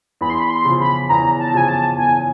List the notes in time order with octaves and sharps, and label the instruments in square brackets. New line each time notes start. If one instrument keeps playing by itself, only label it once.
[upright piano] E2 [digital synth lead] B5
[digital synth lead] C6
B5
C6
[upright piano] C#3 F3
[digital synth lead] B5
[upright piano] E2 [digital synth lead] A#5
[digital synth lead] A5
[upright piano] C#3 F3 [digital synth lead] G#5
[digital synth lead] A5
[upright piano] E2 [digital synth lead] G#5